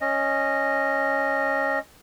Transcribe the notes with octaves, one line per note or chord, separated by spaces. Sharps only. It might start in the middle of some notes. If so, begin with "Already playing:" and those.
C#4 D#5